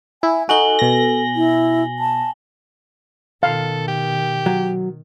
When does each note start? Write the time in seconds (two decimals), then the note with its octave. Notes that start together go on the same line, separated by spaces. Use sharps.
0.23 E4 G#5
0.49 D#4 F#4 A4 G#5 F#7 G7
0.79 B2 A#6
1.36 E4
1.99 A5
3.43 B2 D#3 A4 F5
3.88 G4
4.46 F#3